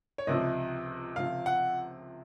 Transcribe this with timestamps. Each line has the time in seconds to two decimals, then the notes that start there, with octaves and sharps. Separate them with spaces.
0.18 C#5
0.27 C#2 C3 F3 D#5
1.16 C#2 C3 F3 F5
1.46 F#5